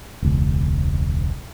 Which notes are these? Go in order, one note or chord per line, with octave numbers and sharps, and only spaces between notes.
E1 C#2